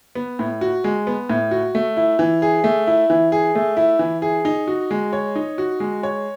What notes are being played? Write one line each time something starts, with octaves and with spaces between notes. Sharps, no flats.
B3
A2
F#4
G#3
B3
A2
F#4
A3
E4
E3
G#4
A3
E4
E3
G#4
A3
E4
E3
G#4
D#4
F#4
G#3
C#5
D#4
F#4
G#3
C#5